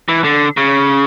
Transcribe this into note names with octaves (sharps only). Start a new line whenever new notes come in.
E3
D3
C#3